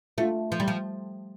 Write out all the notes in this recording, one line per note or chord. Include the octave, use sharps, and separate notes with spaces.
A3 D4 F4 A4
F3
G3
F3